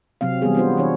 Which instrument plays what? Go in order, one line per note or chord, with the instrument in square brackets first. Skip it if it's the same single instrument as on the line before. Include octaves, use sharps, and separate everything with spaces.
[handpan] C3 F#3 C4 F5
E3 G3 B3 G#4
B3 D4 F4 F#4 C5
E3 D4 C#5